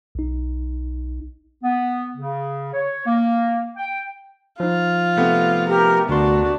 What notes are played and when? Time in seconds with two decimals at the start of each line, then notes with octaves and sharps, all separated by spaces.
0.15 B1 D#4
1.63 B3
2.16 C#3
2.73 C#5
3.06 A#3
3.76 G5
4.60 F3 D#4 F4
5.17 C3 A3 B3
5.68 G4 A#4
6.09 D2 D4 F#4 C6